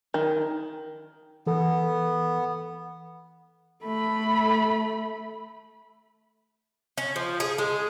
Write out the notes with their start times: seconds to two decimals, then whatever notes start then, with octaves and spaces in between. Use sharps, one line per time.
0.14 D#3
1.47 E3 B3 A4
3.84 A3 B5
6.98 C#4
7.16 F3
7.40 G#4
7.58 G#3